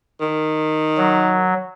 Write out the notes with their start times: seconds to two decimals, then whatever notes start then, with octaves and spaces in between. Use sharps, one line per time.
0.21 D#3
0.98 F#3